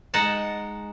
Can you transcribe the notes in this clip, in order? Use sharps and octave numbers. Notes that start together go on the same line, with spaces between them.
G#3 D#4 F#5 A5